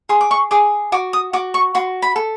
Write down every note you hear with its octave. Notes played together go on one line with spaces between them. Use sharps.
G#4 C6
D6
C#6
G#4 D6
F#4 D6
D#6
F#4 D6
C#6
F#4 C6
B5
A4